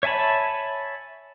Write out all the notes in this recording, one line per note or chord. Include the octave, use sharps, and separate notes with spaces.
C#5 E5 G#5 A5 B5